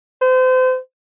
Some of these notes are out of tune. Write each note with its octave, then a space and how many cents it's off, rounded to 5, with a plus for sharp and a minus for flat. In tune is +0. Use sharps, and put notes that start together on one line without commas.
C5 -35